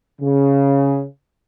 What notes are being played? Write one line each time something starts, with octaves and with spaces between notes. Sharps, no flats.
C#3